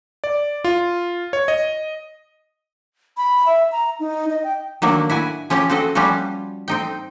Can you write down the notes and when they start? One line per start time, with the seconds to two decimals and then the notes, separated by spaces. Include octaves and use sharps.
0.24 D5
0.64 F4
1.33 C#5
1.48 D#5
3.17 B5
3.46 E5
3.72 A#5
4.00 D#4
4.30 D#5
4.44 G5
4.82 D#3 F#3 A#3 D4
5.10 E4 F#4 G#5
5.50 F3 C#4 G4 C#5
5.70 C4 F#4 A4 D#5
5.95 F3 G3 C#4 F4 F#4
6.68 C4 D#4 G5